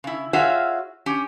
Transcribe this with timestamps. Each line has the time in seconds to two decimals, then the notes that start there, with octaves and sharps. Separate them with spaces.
0.04 C#3 E4
0.33 F4 F#4 G#4 C#5 E5 F5
1.06 C#4 G4